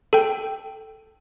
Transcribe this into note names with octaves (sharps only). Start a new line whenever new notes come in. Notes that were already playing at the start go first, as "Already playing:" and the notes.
A4 G5